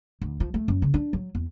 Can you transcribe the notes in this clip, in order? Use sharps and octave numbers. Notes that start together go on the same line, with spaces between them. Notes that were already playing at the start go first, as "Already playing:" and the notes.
D2
F3
A3
F#2
C#3
D4
F#3
E2